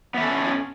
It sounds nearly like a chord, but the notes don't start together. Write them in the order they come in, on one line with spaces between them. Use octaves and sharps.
B3 E5 A4 C#4